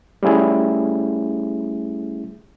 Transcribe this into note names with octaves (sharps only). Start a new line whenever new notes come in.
G3 A3 C#4 E4 G#4